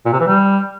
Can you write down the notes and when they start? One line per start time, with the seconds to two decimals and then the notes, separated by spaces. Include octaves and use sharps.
0.06 A#2
0.13 C3
0.20 E3
0.27 G3